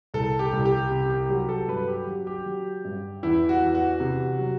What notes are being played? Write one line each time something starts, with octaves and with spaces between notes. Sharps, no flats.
C2 A4
G4
C2
G4
C3 G4
G4
F#3 G4
A4
G2 B4
G4
F#3
G4
F#3
G2
E2 E4
F#4
E2
F#4
C3
F#3